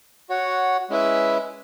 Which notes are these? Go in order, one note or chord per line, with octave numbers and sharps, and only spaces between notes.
F#4 C#5 F#5
G#3 C#4 E4 B4 E5